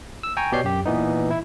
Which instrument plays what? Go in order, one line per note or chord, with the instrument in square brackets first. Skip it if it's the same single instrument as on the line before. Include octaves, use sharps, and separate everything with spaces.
[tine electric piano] E6
G5 G#5 A#5 C#6
B2 G4 C#5 D5 G6 C7
F#2 G4
A#2 E3 B3 D#4
E4